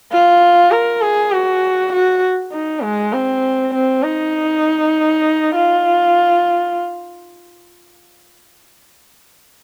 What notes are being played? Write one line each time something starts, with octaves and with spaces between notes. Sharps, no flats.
F4
A#4
G#4
F#4
F#4
D#4
G#3
C4
C4
D#4
F4